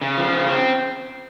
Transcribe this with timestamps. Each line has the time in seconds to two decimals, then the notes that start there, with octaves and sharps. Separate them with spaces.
0.01 C#3
0.17 F3
0.33 C#3
0.47 C4